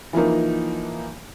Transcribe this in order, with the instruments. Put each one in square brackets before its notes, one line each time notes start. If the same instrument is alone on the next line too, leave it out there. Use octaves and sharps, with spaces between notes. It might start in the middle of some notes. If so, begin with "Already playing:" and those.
[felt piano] E3 F3 A#3 D#4